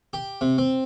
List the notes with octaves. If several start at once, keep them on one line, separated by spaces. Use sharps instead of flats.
G4
C3
C4